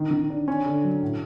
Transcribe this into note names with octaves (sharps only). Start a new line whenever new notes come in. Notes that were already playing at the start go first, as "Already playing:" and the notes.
Already playing: D#3
D#3
D4
C#4
D3
F#3
A2